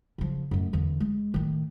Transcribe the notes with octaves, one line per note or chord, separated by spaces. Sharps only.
C#3 F3
F#2 A2
E2 D3
G#3
A2 D#3